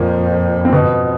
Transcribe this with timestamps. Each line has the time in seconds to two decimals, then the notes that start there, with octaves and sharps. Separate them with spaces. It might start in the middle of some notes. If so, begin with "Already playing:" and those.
Already playing: F2 A#2 A#3
0.65 C4
0.72 F2 B2 B3